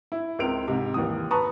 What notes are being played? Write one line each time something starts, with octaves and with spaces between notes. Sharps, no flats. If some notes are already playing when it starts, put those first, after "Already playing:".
E4
C#2 C4 A#4 D7 F7
G#2 C3
D#2 E3 D#6
B4 A5 A#5 C#6 D#6